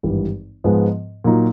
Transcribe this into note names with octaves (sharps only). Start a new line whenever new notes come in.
G#1 G2 E3 G3
G#2 F3 G#3 B3
A#2 F#3 A#3 D#4